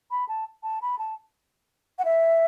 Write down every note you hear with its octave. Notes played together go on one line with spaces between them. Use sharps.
B5
A5
A5
B5
A5
F#5
E5